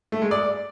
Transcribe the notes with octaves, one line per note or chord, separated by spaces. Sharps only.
A3
G#3
D5